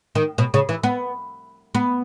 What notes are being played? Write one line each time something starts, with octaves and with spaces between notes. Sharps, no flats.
D#3
B2
C#3
E3
B3
B3